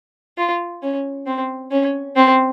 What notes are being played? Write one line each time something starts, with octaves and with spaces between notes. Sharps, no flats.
F4
C#4
C4
C#4
C4